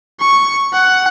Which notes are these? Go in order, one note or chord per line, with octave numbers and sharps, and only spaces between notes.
C#6
F#5